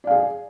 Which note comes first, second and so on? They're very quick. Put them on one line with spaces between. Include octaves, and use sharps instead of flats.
D5 F5 G#4